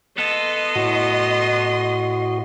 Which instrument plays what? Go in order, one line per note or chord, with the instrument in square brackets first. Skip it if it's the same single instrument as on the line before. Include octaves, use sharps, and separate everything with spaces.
[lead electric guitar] B3 A4 [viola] D#5 C6
[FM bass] A2 [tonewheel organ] F#4